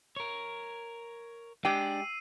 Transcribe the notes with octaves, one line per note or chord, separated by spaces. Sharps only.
A#4 C#5
G#3 D4 G4 G5 E6 C7 D#7